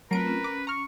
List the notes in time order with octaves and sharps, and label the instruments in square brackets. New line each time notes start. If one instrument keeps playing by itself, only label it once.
[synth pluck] F#3 D7 [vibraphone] A3 C4 F4 [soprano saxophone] A#4 [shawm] B4
[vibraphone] C#4
[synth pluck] D6
[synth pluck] A#5 F6 [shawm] C#6